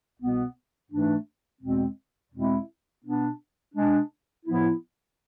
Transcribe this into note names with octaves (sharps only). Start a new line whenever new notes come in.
C2 B2 B3
G#2 E3 A3 D4
E2 B2 G#3 C4
E2 B2 G#3 C4 E4
B2 B3 D4
B2 G#3 D4
A2 F3 B3 E4